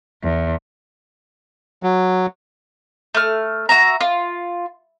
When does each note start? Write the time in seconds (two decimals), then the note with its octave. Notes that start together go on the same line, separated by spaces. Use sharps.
0.21 E2
1.83 F#3
3.15 A3 F6
3.69 F#4 E5 A#5
4.01 F4